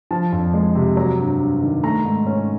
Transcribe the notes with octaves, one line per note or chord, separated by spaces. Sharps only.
F3 A5
F2
G#3
C3
F#3 A#5
G2
G2
D#3
A3 A#5
G#2
C#4